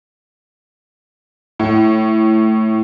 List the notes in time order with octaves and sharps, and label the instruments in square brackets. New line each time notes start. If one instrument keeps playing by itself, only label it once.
[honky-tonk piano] A2